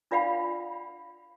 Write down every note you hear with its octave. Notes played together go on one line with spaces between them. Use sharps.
D4 F4 D5 F5 F#5 B5